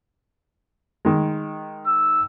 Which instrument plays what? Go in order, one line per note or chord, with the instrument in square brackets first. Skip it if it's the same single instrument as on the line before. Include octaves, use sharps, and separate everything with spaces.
[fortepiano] D#3 G#3
[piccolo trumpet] E6